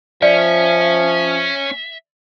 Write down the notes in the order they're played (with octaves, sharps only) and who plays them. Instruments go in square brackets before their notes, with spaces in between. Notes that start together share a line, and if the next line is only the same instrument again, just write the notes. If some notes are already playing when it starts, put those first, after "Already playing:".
[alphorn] F3 [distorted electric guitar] C#4 [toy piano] D5 [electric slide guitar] E5